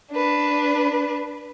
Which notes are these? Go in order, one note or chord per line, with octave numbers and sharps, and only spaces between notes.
D4 B4